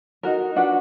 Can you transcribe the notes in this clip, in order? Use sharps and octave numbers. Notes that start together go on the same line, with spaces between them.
D#4 F#4 A#4
D4 F#4 B4 F#5